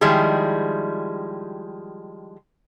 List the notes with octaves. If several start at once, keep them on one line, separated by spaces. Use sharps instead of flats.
D#3 F3 G3 G#3 E4 G#4